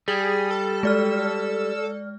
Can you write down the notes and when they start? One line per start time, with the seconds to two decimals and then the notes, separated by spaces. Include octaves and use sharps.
0.08 G3 G#4
0.51 A4
0.83 G#3 D5 F6